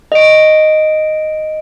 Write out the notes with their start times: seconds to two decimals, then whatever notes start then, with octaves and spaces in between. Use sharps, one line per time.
0.12 D#5 D7